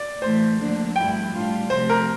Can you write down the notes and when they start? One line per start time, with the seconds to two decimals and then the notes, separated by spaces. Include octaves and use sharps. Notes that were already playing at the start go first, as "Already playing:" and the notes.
Already playing: D5
0.22 A2 E3 A3 C5
0.59 D2 D3 F3 A#3 D4
0.96 G2 F3 A3 E4 G5
1.33 A2 G3 D4 F4
1.70 C3 F3 A3 C5
1.90 A#4